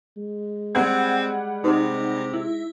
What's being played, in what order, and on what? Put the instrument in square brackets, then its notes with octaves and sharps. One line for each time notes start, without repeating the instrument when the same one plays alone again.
[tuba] G#3
[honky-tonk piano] G3 F#5 G#6 [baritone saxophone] C4
[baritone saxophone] C3 [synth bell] D#4
[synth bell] E4